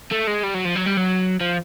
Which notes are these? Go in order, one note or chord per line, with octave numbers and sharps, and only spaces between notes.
A3
G#3
G3
F#3
F3
F#3
G3
F#3
F3